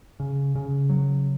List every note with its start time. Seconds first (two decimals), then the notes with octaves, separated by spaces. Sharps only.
0.20 C#3
0.55 C#3
0.90 F#3